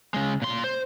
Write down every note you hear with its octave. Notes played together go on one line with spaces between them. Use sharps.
C#3 G#3
A#2 C6
C5